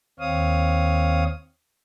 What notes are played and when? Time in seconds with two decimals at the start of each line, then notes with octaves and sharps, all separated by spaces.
0.20 D#2 C4 C#5 F5 D#6